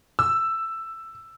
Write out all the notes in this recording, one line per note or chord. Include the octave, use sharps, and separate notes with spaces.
E6